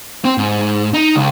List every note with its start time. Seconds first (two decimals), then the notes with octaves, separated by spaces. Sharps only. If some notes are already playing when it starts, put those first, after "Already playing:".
0.25 C4
0.38 G#2
0.94 D#4
1.15 C#2